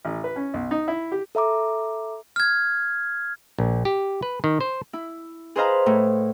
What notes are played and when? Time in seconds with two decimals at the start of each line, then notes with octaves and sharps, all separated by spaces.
0.05 A1
0.24 B4
0.36 C#4
0.54 B1
0.71 D#4
0.88 E4
1.12 G4
1.35 A4 E5 A#5 D6
2.36 F6 G#6
3.59 A#1
3.85 G4
4.23 B4
4.44 D#3
4.61 C5
4.93 E4
5.56 G#4 B4 C5 D#5 F5 A#5
5.86 A2